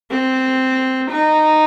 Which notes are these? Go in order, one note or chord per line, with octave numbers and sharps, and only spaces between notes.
C4
D#4